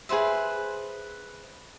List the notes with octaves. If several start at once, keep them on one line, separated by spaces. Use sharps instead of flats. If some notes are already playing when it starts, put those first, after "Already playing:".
G#4 B4 C5 E5